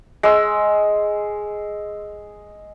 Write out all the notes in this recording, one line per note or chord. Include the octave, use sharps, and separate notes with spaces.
G#3 E6